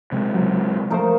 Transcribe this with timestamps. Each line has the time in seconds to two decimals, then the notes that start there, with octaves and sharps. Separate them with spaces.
0.12 C3 G#3
0.34 C#2 F#3
0.90 F3 A3 D#4 A#4 C5 F5